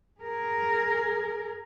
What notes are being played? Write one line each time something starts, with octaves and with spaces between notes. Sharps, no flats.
G#4 A#4